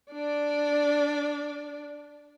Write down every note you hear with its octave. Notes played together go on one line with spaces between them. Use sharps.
D4 D5